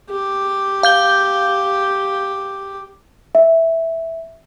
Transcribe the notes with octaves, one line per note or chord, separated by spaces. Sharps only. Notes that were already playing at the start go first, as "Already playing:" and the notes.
G4
F5 G6 G7
E5